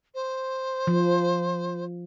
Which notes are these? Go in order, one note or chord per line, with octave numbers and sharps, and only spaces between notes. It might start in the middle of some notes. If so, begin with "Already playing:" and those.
C5
F3